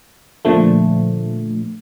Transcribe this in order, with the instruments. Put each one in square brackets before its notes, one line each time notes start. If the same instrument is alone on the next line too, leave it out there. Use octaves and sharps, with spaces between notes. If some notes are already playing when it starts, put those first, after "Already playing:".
[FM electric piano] A#2 D3 F3 A3